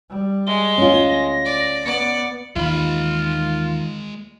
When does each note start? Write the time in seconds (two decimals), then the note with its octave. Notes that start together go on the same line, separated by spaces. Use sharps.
0.10 G3
0.47 G#3 G7
0.78 D2 C#4 F4
1.10 A#6
1.46 D5
1.85 B3 D5 C#7
2.56 D#2 D#3 E3 G#3 F4 B5